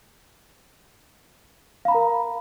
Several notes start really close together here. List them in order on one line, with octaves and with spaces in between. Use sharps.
F5 B5 A#5 A#4